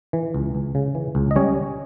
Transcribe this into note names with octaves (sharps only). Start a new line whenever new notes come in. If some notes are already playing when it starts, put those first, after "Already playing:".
E3
C#2
C#2
C#3
E3
C#2
D#5
G3 C#4 C#5